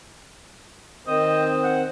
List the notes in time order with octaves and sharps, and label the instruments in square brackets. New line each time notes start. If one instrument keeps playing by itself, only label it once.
[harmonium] D#3 C4 C5 [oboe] D#5
[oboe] F#5